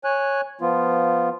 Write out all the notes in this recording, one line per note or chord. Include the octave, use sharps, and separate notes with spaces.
C#5 G#5 F#6
F3 B3 F4